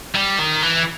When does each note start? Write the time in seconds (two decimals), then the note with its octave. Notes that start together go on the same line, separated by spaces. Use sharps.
0.15 G3
0.39 D#3
0.62 E3